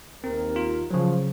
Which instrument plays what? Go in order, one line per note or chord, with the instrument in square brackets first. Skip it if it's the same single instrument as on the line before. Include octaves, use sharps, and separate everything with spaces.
[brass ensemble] D#2 A#4 [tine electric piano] C4
[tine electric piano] F4
[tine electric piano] C#3 F#3 [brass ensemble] F3